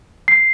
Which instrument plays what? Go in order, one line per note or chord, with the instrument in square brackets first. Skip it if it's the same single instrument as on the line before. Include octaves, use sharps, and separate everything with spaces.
[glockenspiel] C7